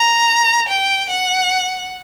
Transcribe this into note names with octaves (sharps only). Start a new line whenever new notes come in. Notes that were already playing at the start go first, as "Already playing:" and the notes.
Already playing: A#5
G5
F#5